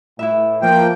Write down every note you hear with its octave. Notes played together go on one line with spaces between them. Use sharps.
A2 E4 B4 E5
F3 A#3 G5